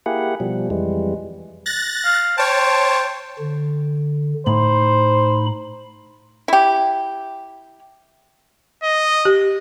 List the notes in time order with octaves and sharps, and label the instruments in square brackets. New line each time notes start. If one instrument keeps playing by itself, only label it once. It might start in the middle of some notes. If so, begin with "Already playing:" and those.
[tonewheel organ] A#3 E4 G4 G#4 F#5
B2 F3 G3
F2 E3 G3 G#3
[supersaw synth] F#6 A6 A#6
[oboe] F5
[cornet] C5 [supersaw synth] C#5 A5 [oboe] G5
[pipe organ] D3
[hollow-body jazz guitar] A2 [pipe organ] D#4 B5 [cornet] C5
[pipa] E4 G4
[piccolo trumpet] D#5
[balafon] G4